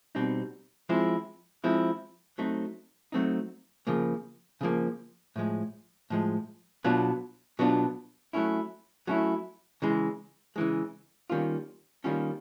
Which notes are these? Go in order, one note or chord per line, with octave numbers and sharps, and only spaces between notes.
B2 G3 C4 D#4
F3 G#3 C4 E4
F3 G#3 C4 E4
F#3 A3 C4 D#4
F#3 A3 C4 D#4
C#3 F3 A#3
C#3 F3 A#3
A2 F3 G#3
A2 F3 G#3
B2 F#3 B3 D4 F4
B2 F#3 B3 D4 F4
F#3 A3 C#4 E4
F#3 A3 C#4 E4
C#3 E3 G#3
C#3 E3 G#3
D#3 G3 A#3 C#4 F4
D#3 G3 A#3 C#4 F4